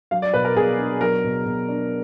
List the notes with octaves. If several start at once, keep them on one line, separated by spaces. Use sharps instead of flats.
F#3 F5
D5
B2 B4
A#4
B2 G#4
D4
F#3 A#4
B2
B2
D4